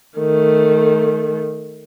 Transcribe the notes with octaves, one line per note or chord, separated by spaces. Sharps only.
D#3 A3